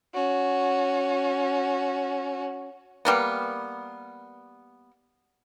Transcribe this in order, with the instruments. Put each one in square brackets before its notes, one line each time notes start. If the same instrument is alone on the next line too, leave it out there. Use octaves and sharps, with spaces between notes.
[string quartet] C#4 F#4
[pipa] G3 A#3 B3